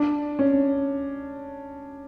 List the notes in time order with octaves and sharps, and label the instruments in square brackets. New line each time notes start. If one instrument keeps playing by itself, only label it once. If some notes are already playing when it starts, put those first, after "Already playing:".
Already playing: [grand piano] D4
C#4